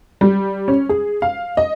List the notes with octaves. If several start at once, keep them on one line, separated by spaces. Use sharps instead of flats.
G3
C#4
G#4
F5
D#5